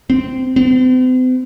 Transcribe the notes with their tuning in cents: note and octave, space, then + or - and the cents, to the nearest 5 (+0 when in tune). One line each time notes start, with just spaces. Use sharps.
C4 -15
C4 -45